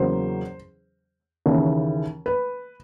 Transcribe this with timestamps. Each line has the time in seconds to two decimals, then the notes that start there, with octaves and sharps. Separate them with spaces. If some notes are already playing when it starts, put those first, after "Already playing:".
Already playing: E2 C#3 F#3 A#3 C5
1.46 D#2 C#3 E3
2.26 B4